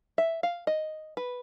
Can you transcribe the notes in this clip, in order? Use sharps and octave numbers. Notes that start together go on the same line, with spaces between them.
E5
F5
D#5
B4